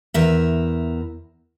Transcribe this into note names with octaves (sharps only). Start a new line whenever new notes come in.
E2 A#4 E5